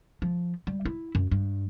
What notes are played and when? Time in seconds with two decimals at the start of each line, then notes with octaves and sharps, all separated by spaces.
0.22 F3
0.67 G3
0.85 E4
1.15 F#2
1.31 G2